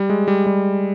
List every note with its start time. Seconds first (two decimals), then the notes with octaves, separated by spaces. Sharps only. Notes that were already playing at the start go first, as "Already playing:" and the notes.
Already playing: G3
0.10 G#3
0.28 G3
0.47 G3